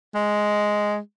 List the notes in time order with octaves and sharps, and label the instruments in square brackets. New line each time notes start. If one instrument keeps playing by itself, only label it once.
[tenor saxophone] G#3